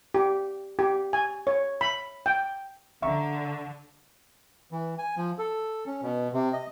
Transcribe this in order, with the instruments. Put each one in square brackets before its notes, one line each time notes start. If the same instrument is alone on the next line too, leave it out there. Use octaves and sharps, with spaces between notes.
[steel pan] G4
G4
G#5
C#5
B5
G5
[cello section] D3 [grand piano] E5 A#5 C#6
[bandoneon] E3
G#5
F3
A4
C#4
B2
C3
D#5